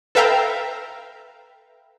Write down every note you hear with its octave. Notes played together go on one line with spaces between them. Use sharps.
A4 B4 E5 F5 G5 A#5